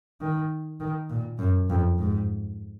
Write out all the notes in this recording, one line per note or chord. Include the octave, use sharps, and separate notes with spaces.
D#3
D#3
A#2
F#2
F2
G#2